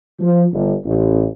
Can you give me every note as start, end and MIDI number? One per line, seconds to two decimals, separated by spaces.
0.20 0.44 53
0.52 0.72 31
0.85 1.26 33